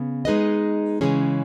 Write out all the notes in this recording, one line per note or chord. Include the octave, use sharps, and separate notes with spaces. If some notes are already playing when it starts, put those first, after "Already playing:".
Already playing: C#3 B3
G#3 D#4 G#4 B4 D#5
C#3 E3 G#3 C#4 G#4